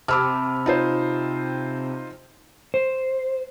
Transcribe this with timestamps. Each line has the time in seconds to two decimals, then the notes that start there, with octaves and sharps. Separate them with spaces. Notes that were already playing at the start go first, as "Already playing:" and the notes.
0.08 C3 A5 B5 D6 E6 F6
0.66 D#4 F4 C5
2.74 C5